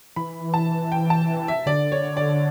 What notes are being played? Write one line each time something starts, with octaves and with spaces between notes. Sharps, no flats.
E3 B5
A5
G5
A5
E5
D3 D5
C#5
D5